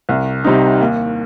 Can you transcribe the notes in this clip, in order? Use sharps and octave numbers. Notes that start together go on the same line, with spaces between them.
C2
C3 G3 C4 D#4
D#2